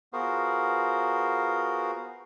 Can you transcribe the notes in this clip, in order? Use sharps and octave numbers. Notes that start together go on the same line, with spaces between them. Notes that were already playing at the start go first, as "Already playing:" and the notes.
B3 F4 F#4 G#4 A#4 C5